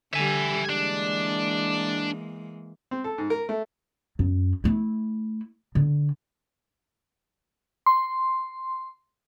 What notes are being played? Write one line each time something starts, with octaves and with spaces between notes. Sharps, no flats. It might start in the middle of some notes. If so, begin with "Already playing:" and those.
D3 G3 E5 G#5
E3 G#3 A#3 D4
C4
A4
G#2
A#4
A3
F#2
A3 E4
D3
C6